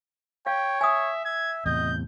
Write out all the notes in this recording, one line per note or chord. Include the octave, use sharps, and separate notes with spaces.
C#5 F5 G5
E5 G#5 D#6
E5 G#6
E2 A2 C3 D#5 G6